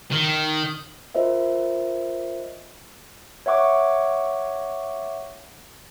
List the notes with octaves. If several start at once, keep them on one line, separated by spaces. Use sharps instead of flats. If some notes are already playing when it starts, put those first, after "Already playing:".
D#3
F4 A#4 C5 D#5 E5
C#5 E5 F#5 C#6 D6